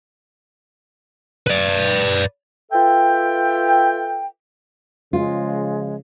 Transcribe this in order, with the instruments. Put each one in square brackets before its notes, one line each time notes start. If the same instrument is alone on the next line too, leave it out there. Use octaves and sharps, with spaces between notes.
[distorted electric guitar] B4 D5
[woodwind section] F4 A4 B4 E5 G5
[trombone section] C#3 F3 [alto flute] G#3 [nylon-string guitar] F4